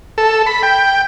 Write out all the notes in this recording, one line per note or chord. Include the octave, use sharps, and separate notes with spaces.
A4
B5
G5